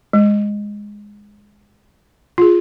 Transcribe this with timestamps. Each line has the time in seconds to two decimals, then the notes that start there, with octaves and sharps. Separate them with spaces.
0.13 G#3
2.38 F4 G#4